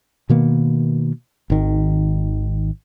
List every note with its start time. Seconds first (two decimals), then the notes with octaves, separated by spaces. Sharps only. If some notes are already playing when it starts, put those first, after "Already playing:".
0.29 B2 D#3 A#3 B3
1.50 G#1 D#3